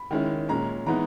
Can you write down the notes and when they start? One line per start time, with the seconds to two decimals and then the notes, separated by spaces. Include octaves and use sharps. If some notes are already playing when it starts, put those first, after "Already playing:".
Already playing: B5
0.11 D#3 G#3 C#4 E4
0.49 A#2 G#3 C#4 A#5
0.86 E3 G#3 B3 D#4 A#5